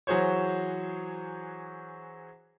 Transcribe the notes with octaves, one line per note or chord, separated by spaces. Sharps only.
E3 F#3 F#4 G#4 C5 C#5